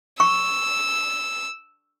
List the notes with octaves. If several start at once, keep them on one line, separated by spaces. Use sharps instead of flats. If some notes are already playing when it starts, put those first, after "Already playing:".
C#6 E6